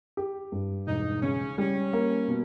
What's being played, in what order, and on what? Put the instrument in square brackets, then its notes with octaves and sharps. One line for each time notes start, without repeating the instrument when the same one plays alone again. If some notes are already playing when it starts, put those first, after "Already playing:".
[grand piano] G4
G2
[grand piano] E1 [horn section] D#4
[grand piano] C#3 [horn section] C#4
[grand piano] G3 [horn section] C#4
[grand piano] A#3
B2